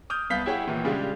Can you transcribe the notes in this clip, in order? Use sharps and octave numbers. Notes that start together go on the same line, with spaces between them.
D6 D#6 F6 G6
C2 B3 F5 G6 B6
E4 G4 G#4 C#5 F#5 G5
A#2 D#3 E3
C#3 G3 G#3 D4 F4 G4